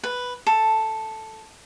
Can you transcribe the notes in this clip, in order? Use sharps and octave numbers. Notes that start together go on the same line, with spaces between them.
B4
A4